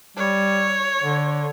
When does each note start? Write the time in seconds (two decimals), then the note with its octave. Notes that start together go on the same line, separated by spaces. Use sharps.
0.17 G3 C#5
1.02 D3